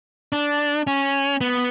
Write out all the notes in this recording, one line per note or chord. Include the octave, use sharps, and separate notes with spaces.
D4
C#4
B3